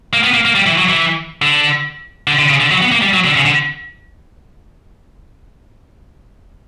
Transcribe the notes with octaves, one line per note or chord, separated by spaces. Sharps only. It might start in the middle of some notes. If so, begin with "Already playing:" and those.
A#3
B3
A#3
A#3
G3
E3
F#3
E3
D3
D3
D3
C#3
D3
F#3
B3
A#3
G3
F#3
D3
C#3
D3